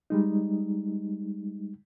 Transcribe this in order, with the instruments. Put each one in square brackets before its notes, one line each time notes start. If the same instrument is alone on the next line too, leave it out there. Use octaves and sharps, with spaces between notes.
[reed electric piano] G3 G#3 D#4